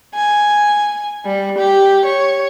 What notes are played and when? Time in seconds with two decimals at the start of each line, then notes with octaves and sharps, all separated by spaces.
0.15 G#5
1.25 G3
1.58 G4
2.06 C#5